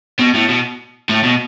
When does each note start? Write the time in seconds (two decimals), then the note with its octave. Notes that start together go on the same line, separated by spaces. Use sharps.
0.19 B2
0.34 A2
0.49 B2
1.09 A2
1.23 B2